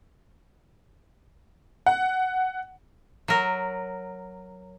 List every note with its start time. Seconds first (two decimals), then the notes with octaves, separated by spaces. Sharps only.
1.86 F#5
3.28 F#3 A#4